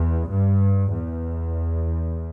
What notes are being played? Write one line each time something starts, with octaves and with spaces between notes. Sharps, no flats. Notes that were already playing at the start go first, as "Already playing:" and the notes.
Already playing: E2
G2
E2